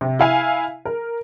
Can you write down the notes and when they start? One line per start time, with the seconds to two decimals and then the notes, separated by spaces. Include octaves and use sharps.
0.01 C3
0.19 E4 F5 G#5
0.85 A#4